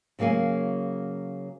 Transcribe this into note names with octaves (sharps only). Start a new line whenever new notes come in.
C#3 F#3 A#3 G#4 G#5